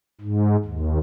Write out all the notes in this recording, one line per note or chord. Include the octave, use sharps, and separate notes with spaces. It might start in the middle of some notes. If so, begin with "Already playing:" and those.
G#2
D#2